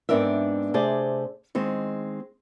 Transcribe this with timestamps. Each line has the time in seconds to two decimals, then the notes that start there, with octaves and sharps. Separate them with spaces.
0.09 G#2 B3 C4 D4 A#4 E5
0.74 C3 A3 G#4 C5 D5
1.55 D#3 G#3 C4